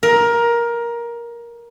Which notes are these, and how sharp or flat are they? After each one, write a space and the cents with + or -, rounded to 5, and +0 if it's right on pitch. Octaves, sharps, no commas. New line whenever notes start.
A#4 +15